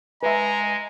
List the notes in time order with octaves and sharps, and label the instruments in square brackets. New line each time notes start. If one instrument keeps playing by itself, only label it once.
[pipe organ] G#3 [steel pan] B4 E5 [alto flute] G#5 [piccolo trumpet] A#5